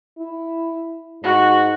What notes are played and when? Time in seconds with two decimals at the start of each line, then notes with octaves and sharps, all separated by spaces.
0.18 E4
1.24 G#2 F#4